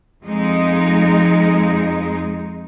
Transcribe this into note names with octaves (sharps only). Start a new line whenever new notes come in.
F2 G#3 D#4